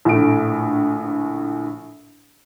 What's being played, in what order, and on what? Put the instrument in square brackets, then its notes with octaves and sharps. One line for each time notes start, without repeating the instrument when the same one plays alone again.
[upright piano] A#1 A2 D3 A3 D7